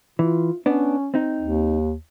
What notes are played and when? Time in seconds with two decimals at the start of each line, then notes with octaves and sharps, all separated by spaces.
0.19 E3 F4
0.66 B3 C#4 D4
1.14 C4 D#4
1.41 D#2